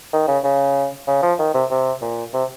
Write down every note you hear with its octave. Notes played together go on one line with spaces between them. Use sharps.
D#3
C#3
C#3
C#3
F3
D#3
C3
C3
A#2
C3